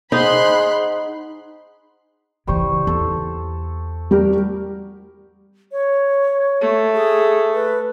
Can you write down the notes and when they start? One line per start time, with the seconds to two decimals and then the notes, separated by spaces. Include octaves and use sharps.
0.12 D#4 G#4 C5 F#5 B5 C6 F#6
2.47 C#3 E3 G3 C5 C#6
2.87 E2 A4
4.11 G3 F#4 G4 A#4
5.72 C#5
6.61 A3
6.94 G#4
7.54 B4